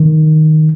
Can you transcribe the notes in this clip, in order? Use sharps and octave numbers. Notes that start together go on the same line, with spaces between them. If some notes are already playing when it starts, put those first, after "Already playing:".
Already playing: D#3